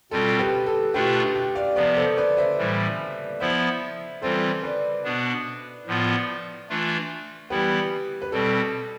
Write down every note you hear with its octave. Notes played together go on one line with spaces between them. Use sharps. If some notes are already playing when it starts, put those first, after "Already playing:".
B2 G3 C4 F4 A4
G4 B4
A4
B2 A3 D4 F4 G4 B4
G4
D5 F5
C3 F3 B3 B4 D5
A4 C5
B4 D5
C5 E5
A2 E3 G3
F3 B3 E4 C5 E5
E3 G3 C4 F4 A4 C5
B4 D5
B2 B3 D4
A2 F3 B3 F4
E3 A3 D4 F4
E3 G3 B3 E4 G4 B4
B4
B2 G3 C4 A4